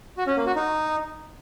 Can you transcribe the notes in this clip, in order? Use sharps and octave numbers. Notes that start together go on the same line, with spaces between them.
F#4
C#4
A#3
F#4
D#4